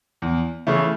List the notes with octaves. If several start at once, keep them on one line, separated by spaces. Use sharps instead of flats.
E2
C#3 E3 A3